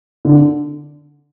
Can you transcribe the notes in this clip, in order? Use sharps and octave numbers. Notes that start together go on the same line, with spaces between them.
D3